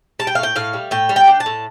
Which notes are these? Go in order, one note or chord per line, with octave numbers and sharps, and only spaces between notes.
G3 A5
G5
A2 F5
G5
A2 F5
G3
A2 G5
G3
G5
D4
A5
A2